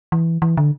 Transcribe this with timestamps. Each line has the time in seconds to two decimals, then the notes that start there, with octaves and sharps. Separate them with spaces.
0.12 E3
0.42 E3
0.57 D3